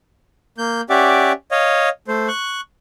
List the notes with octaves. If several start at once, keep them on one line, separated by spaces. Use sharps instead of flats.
A#3 G6
C#4 G4 D5 E5 F#5 D6
C#5 D#5 F5
A3 C5
C#6 F#6